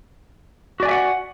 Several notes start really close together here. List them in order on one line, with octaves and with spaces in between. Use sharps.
F#4 D5 G#5 E5 F#5